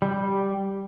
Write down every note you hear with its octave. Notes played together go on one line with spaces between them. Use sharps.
G3